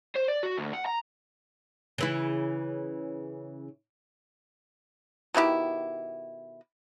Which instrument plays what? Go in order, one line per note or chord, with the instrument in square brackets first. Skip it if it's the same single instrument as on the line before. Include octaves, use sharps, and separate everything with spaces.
[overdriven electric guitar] C5
D5
F#4
D2
F#5
A#5
[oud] C#3 E3 E4
[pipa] B2 D#3 E4 G4